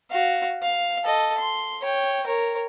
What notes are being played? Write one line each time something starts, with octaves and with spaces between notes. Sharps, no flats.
F#4 F5
F5
A4 D#5
C6
C#5 G5
A#4 C#5